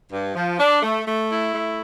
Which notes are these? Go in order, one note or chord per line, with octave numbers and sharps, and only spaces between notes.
G2
F3
D4
A3
A3
E4
A3